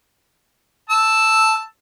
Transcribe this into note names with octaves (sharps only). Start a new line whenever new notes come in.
A5 E6